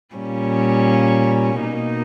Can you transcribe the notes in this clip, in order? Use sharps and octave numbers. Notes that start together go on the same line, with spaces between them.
A#2 G3 C#4
B2 A#3 D#4